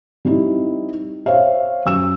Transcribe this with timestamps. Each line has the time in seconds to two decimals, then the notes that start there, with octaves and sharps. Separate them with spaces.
0.25 G3 C4 D#4 E4
1.26 C5 C#5 E5 F5
1.86 F#2 E6 E7